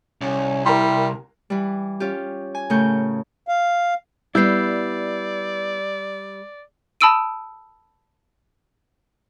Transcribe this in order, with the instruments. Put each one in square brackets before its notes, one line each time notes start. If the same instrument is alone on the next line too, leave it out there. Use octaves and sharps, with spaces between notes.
[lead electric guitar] C2 [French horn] C#4
[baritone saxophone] G3 [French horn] E4 [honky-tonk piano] A#4 A#5 C6
[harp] E3 G3
C#4 F4 G4
G#5
A2 C#3 A3 A#4 C#6 G6
[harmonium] F5
[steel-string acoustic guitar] G3 [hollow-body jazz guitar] B3 E4 [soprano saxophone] D5 [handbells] E6 G6 C7
[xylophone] A5 B5 D#6 E6 D7 D#7